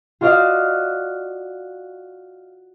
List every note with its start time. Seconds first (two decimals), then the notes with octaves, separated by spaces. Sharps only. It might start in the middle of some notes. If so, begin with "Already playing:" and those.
0.21 F4 F#4 D5 D#5 F5